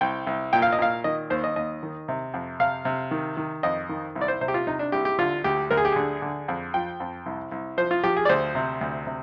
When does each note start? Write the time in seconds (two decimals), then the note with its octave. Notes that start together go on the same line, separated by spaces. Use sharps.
0.01 C2 G5
0.27 C2
0.53 A#2 G5
0.62 F5
0.72 D#5
0.78 A#2 F5
1.04 D#3 D#5
1.30 D#2 C5
1.44 D#5
1.56 D#2 D#5
1.83 D#3
2.08 C3
2.34 F2
2.60 C3 F5
2.85 C3
3.11 D#3
3.37 D#3
3.63 F2 D#5
3.89 D#3
4.15 C2
4.21 D5
4.28 C5
4.41 C3 C5
4.48 G4
4.54 F4
4.67 C3 D#4
4.79 D4
4.92 C2 G4
5.05 G4
5.18 D3 F4
5.44 D2 G4
5.71 D2 A#4
5.77 G#4
5.85 G4
5.92 D3 G#4
6.22 D3
6.48 F2
6.74 F3 G5
7.00 F2
7.26 C2
7.52 C2
7.77 F3 C5
7.91 F4
8.04 F3 G4
8.17 G#4
8.25 D5
8.29 D2 C5
8.55 C3
8.81 D2
9.07 C3